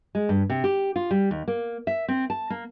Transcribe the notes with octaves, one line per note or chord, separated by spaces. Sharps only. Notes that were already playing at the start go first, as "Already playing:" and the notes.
G#3
G2
C3
G4
F4
G3
D#2
A#3
E5
C4
A5
A#3